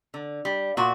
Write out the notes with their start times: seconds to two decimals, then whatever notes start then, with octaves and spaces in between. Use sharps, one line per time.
0.14 D3
0.45 G3
0.77 A#2 F#4